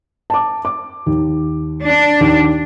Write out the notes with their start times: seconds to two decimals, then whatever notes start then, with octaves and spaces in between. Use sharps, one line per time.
0.30 A5 D6
0.65 D6
1.06 D#2
1.84 D4
2.20 D#2